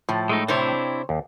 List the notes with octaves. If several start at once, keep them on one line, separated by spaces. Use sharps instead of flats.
A2 F3
G#3 A3 D#4
C3 C4 D4 E4 C5 C#5
D#2